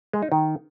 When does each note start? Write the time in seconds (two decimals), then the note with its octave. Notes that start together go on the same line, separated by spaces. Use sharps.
0.13 G#3
0.23 D#4
0.32 D#3